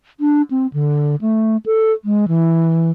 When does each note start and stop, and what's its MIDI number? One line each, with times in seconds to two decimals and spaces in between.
0.20 0.42 62
0.51 0.67 60
0.73 1.16 50
1.21 1.57 57
1.66 1.92 69
2.05 2.25 56
2.28 2.91 52